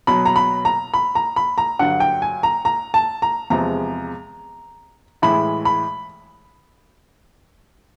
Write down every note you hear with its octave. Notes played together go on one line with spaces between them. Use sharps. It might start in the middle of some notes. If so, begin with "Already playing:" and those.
B2 F#3 B5
A#5
B5
A#5
B5
A#5
B5
A#5
G2 D3 F#3 F#5
G5
G#5
A#5
A#5
A5
A#5
E2 C3 F3 G#3 A#5
A2 E3 G#3 B5
B5